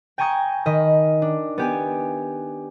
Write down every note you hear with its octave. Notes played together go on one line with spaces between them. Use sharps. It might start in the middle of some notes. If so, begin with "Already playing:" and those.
G5 G#5 A#5 C#6 D#6 G#6
D#3 D#5 B5
D4
B3 G4 G#5